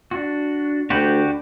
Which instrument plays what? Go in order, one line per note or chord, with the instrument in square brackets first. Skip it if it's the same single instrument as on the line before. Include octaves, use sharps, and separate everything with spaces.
[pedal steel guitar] D4 F#4
[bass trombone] D2 [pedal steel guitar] D4 B5 G6 [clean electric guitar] F#4 G4